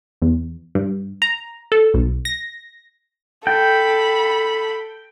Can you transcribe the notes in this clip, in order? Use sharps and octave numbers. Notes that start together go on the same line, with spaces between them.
E2
G2
A#5
A4
B1
A#6
A4 G5 B5